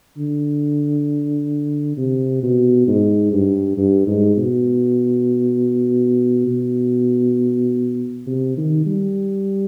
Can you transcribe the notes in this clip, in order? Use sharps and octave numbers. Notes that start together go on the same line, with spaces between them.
D3
C3
B2
G#2
G2
G2
G#2
B2
B2
C3
D#3
G3